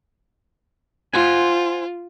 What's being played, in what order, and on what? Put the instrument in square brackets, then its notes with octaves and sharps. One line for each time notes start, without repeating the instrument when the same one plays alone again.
[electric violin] F4 [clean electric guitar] C5 F#5 G#5